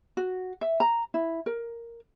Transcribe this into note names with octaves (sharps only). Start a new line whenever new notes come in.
F#4
E5
A#5
E4
A#4